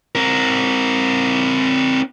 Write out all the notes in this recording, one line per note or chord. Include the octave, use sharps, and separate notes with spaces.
C4 A#4